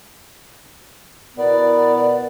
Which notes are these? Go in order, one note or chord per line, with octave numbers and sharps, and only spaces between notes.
B2 B3 E4 A#4 D5